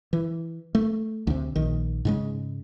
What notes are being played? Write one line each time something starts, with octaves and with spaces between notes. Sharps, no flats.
E3
A3
D2 C3
A#1 D#3
G#2 C#3 G#3